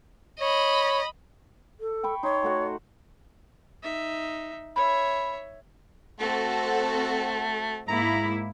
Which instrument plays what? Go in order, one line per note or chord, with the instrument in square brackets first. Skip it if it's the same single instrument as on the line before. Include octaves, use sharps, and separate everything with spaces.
[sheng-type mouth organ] C#5 [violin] D#5 B5
[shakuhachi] A4
[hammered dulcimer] G5 B5 C#6
[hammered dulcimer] D#4 C6 [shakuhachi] C#5
[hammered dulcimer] A3 F#4 F#5
[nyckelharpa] D#4 E5
[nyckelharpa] C#5 E5 [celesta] B5
[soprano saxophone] A3 [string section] C4 F#4 A4
[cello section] G#2 A#3 E4 [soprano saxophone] A#5